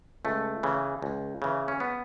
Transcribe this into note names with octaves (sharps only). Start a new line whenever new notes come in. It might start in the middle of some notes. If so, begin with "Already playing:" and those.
C#2 A3
C#3 E3
C#2
C#3 E3
C#4
B3